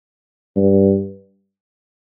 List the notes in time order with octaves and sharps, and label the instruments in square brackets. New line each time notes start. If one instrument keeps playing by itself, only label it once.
[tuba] G2